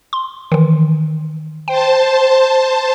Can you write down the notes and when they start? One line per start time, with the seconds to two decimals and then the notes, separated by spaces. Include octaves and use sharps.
0.13 C6
0.52 D#3 E3
1.68 C5 G5 A5